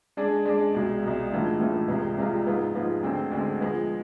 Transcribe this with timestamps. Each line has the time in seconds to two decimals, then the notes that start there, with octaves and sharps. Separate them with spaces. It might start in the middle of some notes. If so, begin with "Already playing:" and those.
0.17 G#3 D4 G#4 D5
0.45 G#3 D4 G#4 D5
0.74 C2 B2 G#3
1.03 C2 B2 G#3
1.32 A2 E3 G#3 D4 F4
1.60 A2 E3 G#3 D4 F4
1.88 C2 C3 G#3 B3 F4
2.17 C2 C3 G#3 B3 F4
2.46 G#2 F3 G#3 B3 F4
2.74 G#2 F3 G#3 B3 F4
3.03 D2 D3 G#3 C4
3.31 D2 D3 G#3 C4
3.60 F3 G#3 B3